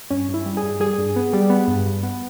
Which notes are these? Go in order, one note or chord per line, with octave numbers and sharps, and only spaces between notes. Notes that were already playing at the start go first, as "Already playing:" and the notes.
G2 C#4
G2
E4
G3
G#4
G2
G3 G#4
G2
B3
G3
B3
G2
G2
B3